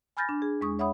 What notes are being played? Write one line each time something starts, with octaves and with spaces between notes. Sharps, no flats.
G#5 B5 F6 G6 A6 A#6
D4
G#4
E2 G#3 C#6 D#6
C#5 E5 F#5 B5 D#6